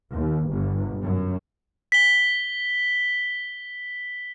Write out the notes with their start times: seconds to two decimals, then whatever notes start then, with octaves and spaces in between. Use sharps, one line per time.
0.13 D#2
0.49 G1
1.02 F#2
1.92 B6 G7